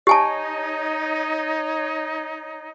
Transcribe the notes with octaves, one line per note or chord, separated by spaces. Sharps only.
D#4 G4 C#5 G#5 A5